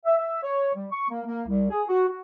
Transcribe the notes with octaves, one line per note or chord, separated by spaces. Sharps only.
E5
E5
C#5
G3
C#6
A#3
A#3
C2
G#4
F#4
F#4